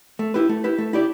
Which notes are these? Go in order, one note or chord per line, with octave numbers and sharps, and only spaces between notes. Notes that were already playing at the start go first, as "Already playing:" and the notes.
A3
E4 G4 B4
A3
E4 G4 B4
A3
E4 G4 D5